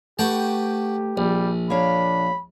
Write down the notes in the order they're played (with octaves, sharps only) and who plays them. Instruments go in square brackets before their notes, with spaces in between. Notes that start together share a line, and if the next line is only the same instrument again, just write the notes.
[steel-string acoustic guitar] A3 B4 [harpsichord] F#4 G5 A5 [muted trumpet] G4
[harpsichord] A#1 [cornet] G3
[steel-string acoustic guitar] A#3 C#5 F5 [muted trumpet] D4 [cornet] B5